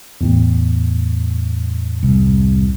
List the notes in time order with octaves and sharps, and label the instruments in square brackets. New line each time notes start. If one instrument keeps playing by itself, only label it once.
[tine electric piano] E2 A2
[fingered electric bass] C2